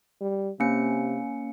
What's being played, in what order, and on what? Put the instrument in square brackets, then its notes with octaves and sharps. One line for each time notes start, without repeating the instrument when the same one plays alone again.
[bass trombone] G3
[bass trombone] C3 [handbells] A#3 C#4 C#7